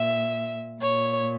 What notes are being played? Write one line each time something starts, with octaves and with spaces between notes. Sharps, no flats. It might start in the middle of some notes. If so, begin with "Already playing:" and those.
Already playing: A#2 E5
A#2 C#5